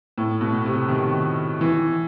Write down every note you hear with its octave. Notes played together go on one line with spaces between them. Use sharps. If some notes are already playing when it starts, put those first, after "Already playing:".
A2
B2
C3
D#3
E3